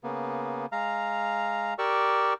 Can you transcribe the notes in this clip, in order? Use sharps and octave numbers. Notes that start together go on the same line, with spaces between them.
C#3 A#3 B3
G#3 F5 A#5
G4 A#4 D5 C#6 E6